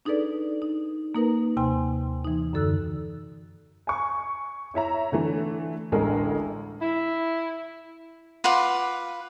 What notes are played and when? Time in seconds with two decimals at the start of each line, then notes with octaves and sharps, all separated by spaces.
0.05 D4 D#4 G#4 A4 B4 D5
0.62 D#4
1.15 A#3 D#4 A#4 B4
1.57 D#2 C3 G5 G#5 C6
2.25 E3 D#4
2.53 F#2 D3 A4 E6 F#6
3.87 G#5 C#6
4.74 E4 C#5 E5 A#5
5.12 D3 E3 A3
5.92 A1 D2 D3 G#3 A4 A#4
6.81 E4
8.44 F4 B4 F#5 D6